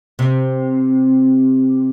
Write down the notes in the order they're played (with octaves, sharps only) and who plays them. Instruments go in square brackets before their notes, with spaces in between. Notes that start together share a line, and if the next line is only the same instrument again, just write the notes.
[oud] C3